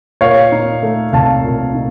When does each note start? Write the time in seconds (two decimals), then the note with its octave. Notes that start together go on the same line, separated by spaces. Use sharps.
0.21 A#2 C#5 F5
0.52 D#4
0.82 A3
1.13 C2 F5 A5
1.44 A#2
1.74 D#4